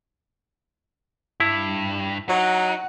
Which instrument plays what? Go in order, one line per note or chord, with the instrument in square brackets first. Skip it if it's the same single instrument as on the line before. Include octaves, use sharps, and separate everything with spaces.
[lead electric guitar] G2 [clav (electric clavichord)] E4
[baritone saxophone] F#3 [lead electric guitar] D#4 [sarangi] F#5